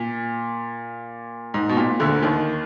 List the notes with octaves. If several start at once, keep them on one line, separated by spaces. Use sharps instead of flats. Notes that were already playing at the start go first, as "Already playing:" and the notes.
Already playing: A#2
G#2
B2
A#2
D2 D3
D#2 D#3